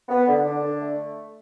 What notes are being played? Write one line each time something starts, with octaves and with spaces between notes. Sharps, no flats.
B3
D3
D4
D3
A3